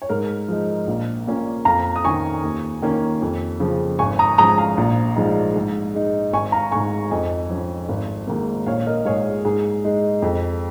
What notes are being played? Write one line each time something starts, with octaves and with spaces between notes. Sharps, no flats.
C#5
G#2 A#4
F3 G#3 D#4
A#1
A#2 A#3 C#4
F2 F5 A#5
D#6
D#3 C#4 G#5 C#6
D#2
D#3 A#3 C#4
F2
C#3 F3
G#1 G#5 C#6
A#5 D#6
G#2 F3 C#4 A#5 D#6
F5 A#5
A#1
G#2 F3 G#3 D#4
G#2
G#3 D#4
G#1 G#5 C#6
F5 A#5
G#2 G#3 G#5 C#6
F2 D#5 G#5
F3 C#4
G#1
G#2 D#3 A#3
A#1 C#5 F5
A#4 D#5
G#2 G#3 G#4 C#5
G#2 G#4
G#3 D#4
F2